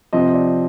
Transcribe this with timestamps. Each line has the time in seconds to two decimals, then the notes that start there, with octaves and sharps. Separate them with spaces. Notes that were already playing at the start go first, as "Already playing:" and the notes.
0.13 C3 F3 C4 D#5
0.34 D5